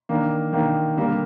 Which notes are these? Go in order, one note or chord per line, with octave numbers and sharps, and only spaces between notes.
D#3 A#3 D4
D#3 A#3 D4
D3 G3 A#3